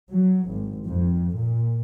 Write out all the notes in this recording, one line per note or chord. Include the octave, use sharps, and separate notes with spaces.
F#3
G#1
F2
A#2